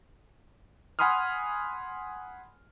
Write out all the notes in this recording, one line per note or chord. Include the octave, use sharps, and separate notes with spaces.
F#5 G#5 B5 C6 D#6 F6